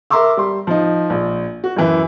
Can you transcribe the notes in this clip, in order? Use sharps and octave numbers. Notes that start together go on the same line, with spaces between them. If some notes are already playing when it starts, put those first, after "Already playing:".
A#4 E5 A#5 C6 D6 E6
G3 C6
F3 D#4
A#1
F#4
F#2 E3 E4